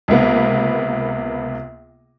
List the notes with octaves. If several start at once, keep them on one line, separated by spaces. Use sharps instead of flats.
C#2 C3 A#3 B3